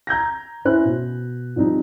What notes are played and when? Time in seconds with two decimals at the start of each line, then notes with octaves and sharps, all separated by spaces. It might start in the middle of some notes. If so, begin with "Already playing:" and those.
0.07 A#5 G6 G#6 A#6
0.65 C#4 E4 C5 B5 F#6
0.85 B2
1.56 F3 G3 C4 D#4